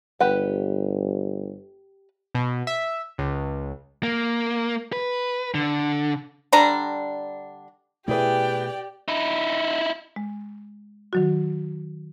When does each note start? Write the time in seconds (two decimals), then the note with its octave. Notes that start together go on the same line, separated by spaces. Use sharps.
0.20 G1 G4 B4 F#5
2.35 B2
2.67 E5
3.18 C#2
4.03 A#3
4.92 B4
5.54 D3
6.53 D3 G3 D4 A#5
8.08 B2 A3 E4 G4 G#4 B4 D5 G5
9.08 D#4 E4
10.16 G#3
11.13 D#3 F#3 F#4